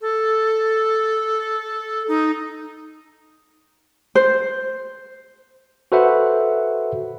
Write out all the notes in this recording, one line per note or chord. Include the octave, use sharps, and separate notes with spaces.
A4
D#4
C5
F#4 A4 B4 C5 E5 F#5